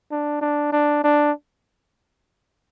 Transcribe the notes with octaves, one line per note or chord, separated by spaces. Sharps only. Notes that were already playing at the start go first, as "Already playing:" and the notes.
D4
D4
D4
D4